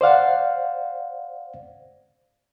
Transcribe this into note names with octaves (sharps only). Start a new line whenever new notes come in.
C5 D5 F5 F#5